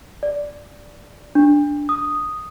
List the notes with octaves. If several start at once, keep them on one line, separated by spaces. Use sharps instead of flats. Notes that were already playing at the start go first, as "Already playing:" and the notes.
D5
D4
D#6